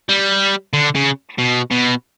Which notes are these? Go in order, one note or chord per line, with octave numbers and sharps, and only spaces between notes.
G3
D3
C#3
B2
B2